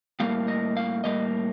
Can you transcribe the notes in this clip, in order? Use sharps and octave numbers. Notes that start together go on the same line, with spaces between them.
A2 G3 A#3 F5
D#5
F5
A2 G3 A#3 D#5